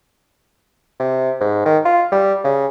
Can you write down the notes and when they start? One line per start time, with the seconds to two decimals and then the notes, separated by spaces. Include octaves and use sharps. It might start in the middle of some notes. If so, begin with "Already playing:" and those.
1.00 C3
1.40 G#2
1.65 D#3
1.85 F4
2.12 G3
2.44 C#3